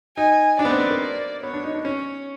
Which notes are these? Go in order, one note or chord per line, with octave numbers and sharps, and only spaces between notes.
D#4 G#5
D4 D5
B3
C4
B3
A#3
D5
B3 C#5
D4
D#4
D4
C#4 C#5